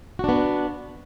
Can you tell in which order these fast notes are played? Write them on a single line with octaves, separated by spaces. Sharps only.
F#4 D4 B3